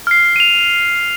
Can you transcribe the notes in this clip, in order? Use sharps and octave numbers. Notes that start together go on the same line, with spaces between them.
F6 C7
D#7 F7